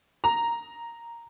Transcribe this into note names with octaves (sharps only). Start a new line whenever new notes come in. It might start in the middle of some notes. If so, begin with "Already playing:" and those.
A#5